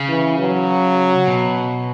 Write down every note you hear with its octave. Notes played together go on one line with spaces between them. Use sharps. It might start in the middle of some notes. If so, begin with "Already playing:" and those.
Already playing: C#3
E3
F#3
B2